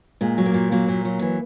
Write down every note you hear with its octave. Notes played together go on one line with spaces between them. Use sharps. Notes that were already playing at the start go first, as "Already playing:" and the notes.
A#2 G#3
F#3
A#3
A#2
F#3 A#3
A#2
F#3
E3